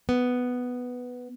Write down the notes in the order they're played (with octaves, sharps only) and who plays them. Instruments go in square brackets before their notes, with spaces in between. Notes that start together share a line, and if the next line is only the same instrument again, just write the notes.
[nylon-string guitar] B3